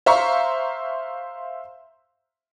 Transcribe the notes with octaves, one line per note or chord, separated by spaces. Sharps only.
C5 E5 F5 A#5 C#6